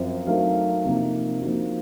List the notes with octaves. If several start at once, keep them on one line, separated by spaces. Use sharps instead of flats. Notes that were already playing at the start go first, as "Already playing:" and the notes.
Already playing: F#2 F3 C4
F#3 A3 D#4 A#4 F5
C3 F3 A#3 D#4
F3 A#3 D#4 F#4